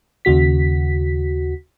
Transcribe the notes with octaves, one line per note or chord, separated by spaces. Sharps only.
D#2 C#3 F#4 B6